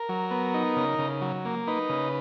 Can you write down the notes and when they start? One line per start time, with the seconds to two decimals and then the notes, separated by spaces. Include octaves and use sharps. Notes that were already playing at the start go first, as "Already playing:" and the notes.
Already playing: A#4
0.09 F#3
0.31 B3
0.54 D#4
0.76 C#3
0.99 C#3
1.21 F#3
1.45 A#3
1.67 D#4 B4
1.89 C#3